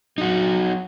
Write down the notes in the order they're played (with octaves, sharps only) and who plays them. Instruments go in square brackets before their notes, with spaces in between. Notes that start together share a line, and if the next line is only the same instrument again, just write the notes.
[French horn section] F#3 [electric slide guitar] D#4 F#4